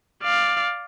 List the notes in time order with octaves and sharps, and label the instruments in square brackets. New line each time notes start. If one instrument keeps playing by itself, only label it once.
[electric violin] D5 F5